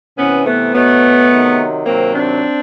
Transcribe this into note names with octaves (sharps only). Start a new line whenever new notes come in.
C3 E3 B3 C#4
A3 B3
B2 F#3 A3 B3
C3 D#3 F#3
C3 D#3 F#3 A#3 C4
C4 D4